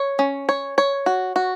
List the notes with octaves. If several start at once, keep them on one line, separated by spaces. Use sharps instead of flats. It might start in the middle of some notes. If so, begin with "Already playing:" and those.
Already playing: C#5
C#4
C#5
C#5
F#4
F#4